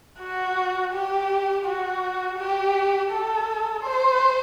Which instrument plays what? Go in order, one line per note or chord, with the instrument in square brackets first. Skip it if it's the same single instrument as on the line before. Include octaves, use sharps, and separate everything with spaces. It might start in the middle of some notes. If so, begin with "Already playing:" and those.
[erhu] F#4
G4
F#4
G4
A4
C5